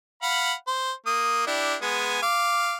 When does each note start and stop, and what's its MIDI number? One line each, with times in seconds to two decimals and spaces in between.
0.22 0.54 77
0.22 0.54 78
0.22 0.54 83
0.67 0.92 72
1.06 1.46 58
1.06 1.46 87
1.47 1.75 62
1.47 1.75 64
1.47 1.75 67
1.82 2.21 56
1.82 2.21 59
1.82 2.21 80
2.22 2.77 77
2.22 2.77 86